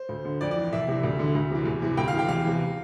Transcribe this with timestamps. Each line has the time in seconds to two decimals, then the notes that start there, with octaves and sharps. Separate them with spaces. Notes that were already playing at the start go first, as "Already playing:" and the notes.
Already playing: C5
0.09 D2
0.25 D3
0.41 F2 D5
0.51 D5
0.56 E3
0.73 C2 E5
0.88 C3 E3
1.03 D2
1.19 D3
1.35 D2
1.50 C3 E3
1.66 E2
1.82 C3 E3
1.97 D2 G5
2.08 F5
2.14 C3 E3 G5
2.29 E2 F5
2.45 C3 E3